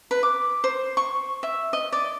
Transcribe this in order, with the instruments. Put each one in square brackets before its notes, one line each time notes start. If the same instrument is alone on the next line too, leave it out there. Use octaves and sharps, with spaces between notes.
[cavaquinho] B4
D6
C5
C#6
E5
D#5
D5